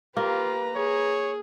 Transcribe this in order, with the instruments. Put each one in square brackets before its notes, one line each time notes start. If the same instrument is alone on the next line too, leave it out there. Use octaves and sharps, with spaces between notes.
[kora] A#3 [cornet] F4 [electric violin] G4 [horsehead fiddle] B4 A#5
[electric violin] G#4 [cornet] C#5